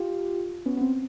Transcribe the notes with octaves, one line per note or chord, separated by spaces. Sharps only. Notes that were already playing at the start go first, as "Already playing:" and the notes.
Already playing: F4 G4
B3 C#4
B3
C4